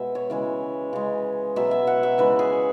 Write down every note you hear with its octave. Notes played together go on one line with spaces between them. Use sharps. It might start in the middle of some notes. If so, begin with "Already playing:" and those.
Already playing: B2 G#3 E5
C#5
C#3 E3 G#3
C#3 G#3
B2 F#3 E5
E5
F#5
E5
C#3 E3 G#3 B4
G#4